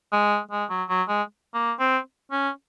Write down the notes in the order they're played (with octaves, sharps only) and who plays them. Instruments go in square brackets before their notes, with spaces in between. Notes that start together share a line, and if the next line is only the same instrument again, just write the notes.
[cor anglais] G#3
G#3
F#3
F#3
G#3
A#3
C4
C#4